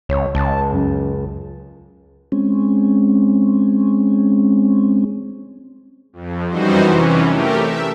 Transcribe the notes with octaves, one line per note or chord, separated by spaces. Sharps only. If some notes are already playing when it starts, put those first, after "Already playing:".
C#2 C#5
C#2 A5
F#2
G#3 C4 C#4
F2
F#2 E3 G3 D#4 F#4 C5
C3 E3 C#4
A3 G4 A#4
E5